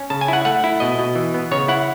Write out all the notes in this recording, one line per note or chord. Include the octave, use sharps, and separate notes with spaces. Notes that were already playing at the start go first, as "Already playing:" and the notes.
Already playing: C#4
C#3 A5
G#5
E4 F#5
A3 F#5
E4
B2 D#5
B2
E3
B3
C#3 C#5
E4 F#5